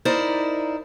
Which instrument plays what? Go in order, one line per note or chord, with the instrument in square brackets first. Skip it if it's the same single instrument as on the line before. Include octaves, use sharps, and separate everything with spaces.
[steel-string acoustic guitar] D#4 E4 A#4 C5 D5